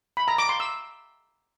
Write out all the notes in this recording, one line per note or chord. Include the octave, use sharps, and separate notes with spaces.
B5
A#5
D6
C6
E6